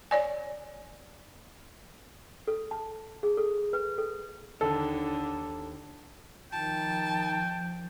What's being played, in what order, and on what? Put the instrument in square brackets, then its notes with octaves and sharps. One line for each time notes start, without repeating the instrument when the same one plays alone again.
[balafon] C#5 D5 G#5
[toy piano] A4
A5
G#4
A4
B4
A4
[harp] D#2 [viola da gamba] D3 [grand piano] A4
[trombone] D#3 [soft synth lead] F3 [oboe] G5 [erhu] A5